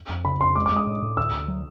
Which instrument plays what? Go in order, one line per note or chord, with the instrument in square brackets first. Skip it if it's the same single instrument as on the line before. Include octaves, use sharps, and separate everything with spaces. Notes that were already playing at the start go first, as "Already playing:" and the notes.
[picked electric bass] F2
[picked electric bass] C#3 [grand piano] B5
[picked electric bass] F2 [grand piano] C6
[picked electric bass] G#3 [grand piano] D6
[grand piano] D6
[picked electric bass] G#3 [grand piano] D#6
[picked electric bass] A2
A2
[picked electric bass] D2 [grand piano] E6
[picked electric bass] D2
F#3